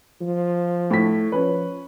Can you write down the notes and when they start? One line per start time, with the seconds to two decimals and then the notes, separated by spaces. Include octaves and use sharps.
0.21 F3
0.91 A2 B6
1.32 F3 C#4 B4